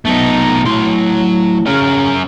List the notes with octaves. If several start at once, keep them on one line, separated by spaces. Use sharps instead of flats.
B1 A3 D#4
A2 F#3 C6
C#3 C#4 A#4